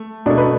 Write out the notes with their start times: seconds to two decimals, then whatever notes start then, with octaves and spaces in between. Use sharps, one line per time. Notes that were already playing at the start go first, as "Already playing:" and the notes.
Already playing: A3
0.26 B2 A3 D4
0.38 B4